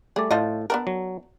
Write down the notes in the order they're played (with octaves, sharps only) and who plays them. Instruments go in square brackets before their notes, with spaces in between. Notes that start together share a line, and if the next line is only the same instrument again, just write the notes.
[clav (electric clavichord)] G3 A3 D5 [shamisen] G#4
[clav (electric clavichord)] A2 A5 [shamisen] F3 F4 D#5
[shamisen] B3 D4 A#4
[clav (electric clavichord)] F#3